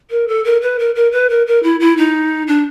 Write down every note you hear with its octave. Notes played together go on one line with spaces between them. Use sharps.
A#4
A4
A#4
B4
A#4
A#4
B4
A#4
A#4
E4
E4
D#4
D4